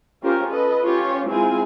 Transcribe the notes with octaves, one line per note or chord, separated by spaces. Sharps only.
C#4 F4 G4 A#4 C5
A4 B4 D#5
C#4 F4 G4 C#5
G#3 C4 E4 F4 G#5